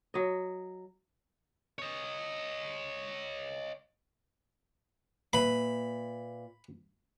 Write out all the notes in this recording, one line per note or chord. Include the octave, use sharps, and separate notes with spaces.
F#3 D#5
C#5 D#5
A#2 B4 E5 B5